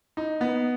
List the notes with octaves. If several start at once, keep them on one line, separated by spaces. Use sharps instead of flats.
D#4
B3